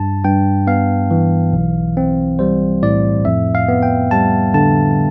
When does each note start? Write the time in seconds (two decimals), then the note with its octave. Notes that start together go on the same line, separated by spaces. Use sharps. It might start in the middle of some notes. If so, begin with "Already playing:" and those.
Already playing: G2 A5
0.24 G2 G5
0.67 B3 F5
1.11 E3
1.53 B1
1.97 C4
2.39 G3 C5
2.82 A2 D5
3.25 F2 E5
3.55 F5
3.68 B3
3.83 G5
4.11 G3 A5
4.54 D3 A5